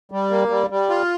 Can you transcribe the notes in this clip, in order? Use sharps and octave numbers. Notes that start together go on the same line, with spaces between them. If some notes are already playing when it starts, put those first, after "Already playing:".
G3
A#3
G3
G3
F4